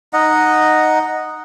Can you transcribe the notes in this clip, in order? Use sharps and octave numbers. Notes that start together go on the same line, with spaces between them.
D#4 D#5 F#5